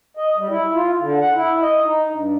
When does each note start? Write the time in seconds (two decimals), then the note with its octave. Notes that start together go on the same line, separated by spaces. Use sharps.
0.17 D#5
0.38 G3
0.50 E4
0.74 F4
1.00 D3
1.21 F#5
1.34 E4
1.62 D#5
1.85 D#4
2.10 G2